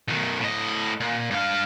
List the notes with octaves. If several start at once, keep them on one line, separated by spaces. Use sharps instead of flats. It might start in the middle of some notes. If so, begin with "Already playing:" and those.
B1 D#3
A2 D#5
A#2
G2 F5